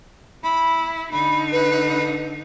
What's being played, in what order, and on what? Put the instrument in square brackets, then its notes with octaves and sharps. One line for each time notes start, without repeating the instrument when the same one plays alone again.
[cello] E4 [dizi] B5
[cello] D3 D#4 [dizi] B5
[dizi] B4